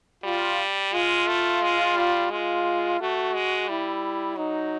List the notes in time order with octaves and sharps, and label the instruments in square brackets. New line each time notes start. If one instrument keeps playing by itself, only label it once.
[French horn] G3 [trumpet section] F4
[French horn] G#3 [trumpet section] F4
[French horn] A3
G#3
G3
[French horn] G#3 [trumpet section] F4
[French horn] A3 [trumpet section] F#4
[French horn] G#3
[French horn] G3 [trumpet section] E4
[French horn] F#3 [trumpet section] D#4